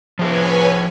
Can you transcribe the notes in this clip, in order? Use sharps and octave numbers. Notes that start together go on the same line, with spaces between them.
F3 G#4 B4 C#5 G#5